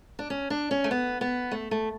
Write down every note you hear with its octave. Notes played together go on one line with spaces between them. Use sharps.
D4
C#4
D4
C#4
A3
B3
B3
A3
A3